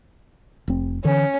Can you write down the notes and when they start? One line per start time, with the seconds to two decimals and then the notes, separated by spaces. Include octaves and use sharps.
0.68 F1 C4
1.04 D3 E3 C#4